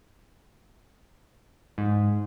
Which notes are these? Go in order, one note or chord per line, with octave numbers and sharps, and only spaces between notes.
G#2